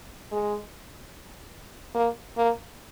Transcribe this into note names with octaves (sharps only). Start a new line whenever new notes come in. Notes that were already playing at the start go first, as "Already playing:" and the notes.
G#3
A#3
A#3